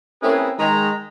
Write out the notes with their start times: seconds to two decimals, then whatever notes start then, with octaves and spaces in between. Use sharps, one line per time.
0.22 A#3 C4 C#4 E4 G#4 B4
0.58 D#3 G#3 A#5